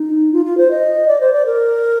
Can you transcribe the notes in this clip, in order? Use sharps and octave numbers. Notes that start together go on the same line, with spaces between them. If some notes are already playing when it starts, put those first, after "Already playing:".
Already playing: D#4
F4
F4
C5
D#5
D5
C5
D5
A#4